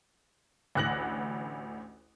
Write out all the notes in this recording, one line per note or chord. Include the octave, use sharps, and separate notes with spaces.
A1 D2 F#6 A#6 F#7